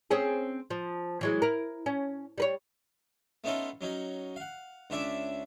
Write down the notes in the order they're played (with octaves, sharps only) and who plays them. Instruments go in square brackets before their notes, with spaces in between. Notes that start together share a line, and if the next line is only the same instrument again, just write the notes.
[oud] C4 C#4 G#4
F3
E3 F#3 G#3
E4 A#4
C#4
G3 B4 C#5
[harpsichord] A3 B3 C#4 D#4 F4 A4
F#3 C#4 D#4
F5 F#5
C#2 C#4 D4 E5 A5 D6